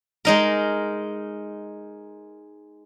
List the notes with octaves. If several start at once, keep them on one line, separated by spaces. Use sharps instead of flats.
G#3 D#4 A#4